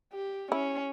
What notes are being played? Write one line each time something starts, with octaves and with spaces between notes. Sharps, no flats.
G4
C#4 E4